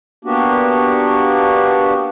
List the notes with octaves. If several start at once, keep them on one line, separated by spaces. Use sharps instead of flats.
A#3 B3 D4 F#4 G4